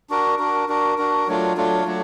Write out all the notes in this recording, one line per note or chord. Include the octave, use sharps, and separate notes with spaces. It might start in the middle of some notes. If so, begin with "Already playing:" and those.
D4 F#4 A#4
D4 F#4 A#4
D4 F#4 A#4
D4 F#4 A#4
F#3 A3 D4 F4
F#3 A3 D4 F4
F#3 A3 D4